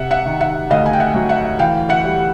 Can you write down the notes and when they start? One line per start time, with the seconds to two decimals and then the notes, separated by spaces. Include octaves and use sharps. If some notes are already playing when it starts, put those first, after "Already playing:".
Already playing: C3 E5 F#5
0.11 E5 F#5
0.26 D#3
0.41 E5 F#5
0.70 D2 D#5 F5
0.86 G#5
0.93 G5
1.00 E5 F#5
1.14 F#3
1.29 E5 F#5
1.59 E3 F5 G5
1.89 E5 F#5
2.05 G3